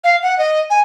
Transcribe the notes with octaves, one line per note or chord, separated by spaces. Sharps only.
F5
F#5
D#5
G#5